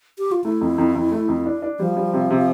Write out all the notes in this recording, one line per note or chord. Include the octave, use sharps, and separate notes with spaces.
G4
F4
A3 E4
F2
F2
F2
A3
F2
D4
D4
F3 G3
G3
C3
C3